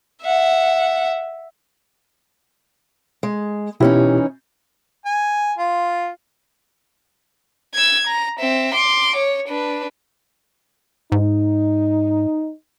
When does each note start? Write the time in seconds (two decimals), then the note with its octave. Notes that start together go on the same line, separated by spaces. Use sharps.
0.22 E5 F#5
3.23 G#3
3.80 B2 E3 C#4 D#4 E4 G4
5.05 G#5
5.58 F4
7.74 E6 G#6
8.07 A#5
8.40 C4 E5
8.75 C6 D6
9.16 C#5
9.49 D4 B4
11.12 G#2 D#4